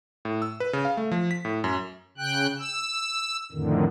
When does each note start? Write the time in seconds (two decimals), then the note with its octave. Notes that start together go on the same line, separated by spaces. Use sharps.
0.25 A2
0.42 E6
0.60 B4
0.73 C#3
0.85 F5
0.97 A3
1.12 F3
1.31 B6
1.45 A2
1.64 F#2
2.18 C#3 G5 F#6
2.59 E6
3.52 F2 A2 D3 D#3